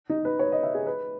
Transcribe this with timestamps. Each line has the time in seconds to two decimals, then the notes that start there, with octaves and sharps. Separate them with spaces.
0.10 D#4
0.25 B4
0.39 C#5
0.52 D#5
0.63 E5
0.75 G#4
0.87 B4